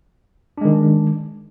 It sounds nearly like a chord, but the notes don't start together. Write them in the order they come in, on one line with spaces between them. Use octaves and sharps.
D4 G#3 D#3